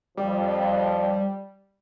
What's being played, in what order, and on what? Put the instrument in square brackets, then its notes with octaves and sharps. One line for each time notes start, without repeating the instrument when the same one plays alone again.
[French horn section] F2 F3 [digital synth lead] G3